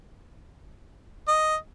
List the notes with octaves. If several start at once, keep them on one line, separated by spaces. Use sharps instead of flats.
D#5